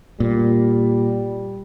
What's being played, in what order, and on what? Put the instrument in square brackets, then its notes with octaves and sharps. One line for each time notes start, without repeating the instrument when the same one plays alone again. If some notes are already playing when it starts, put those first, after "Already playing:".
[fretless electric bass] A#2 [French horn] G3